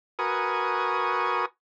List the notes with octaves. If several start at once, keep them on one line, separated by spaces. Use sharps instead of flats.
F#4 A#4 B4 G#5 C#6 D#6